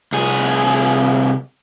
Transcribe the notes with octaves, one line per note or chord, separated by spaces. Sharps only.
C2 G#4